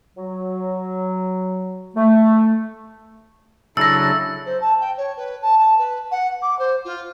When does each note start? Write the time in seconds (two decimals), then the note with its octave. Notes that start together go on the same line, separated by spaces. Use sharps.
0.17 F#3
1.96 A3
3.77 C#3 F#3 D4 E4 A4 E6 A#6
4.46 C5
4.60 A5
4.80 G5
4.97 C#5
5.17 B4
5.42 A5
5.58 A5
5.78 B4
6.11 F#5
6.42 D6
6.59 C5
6.85 F4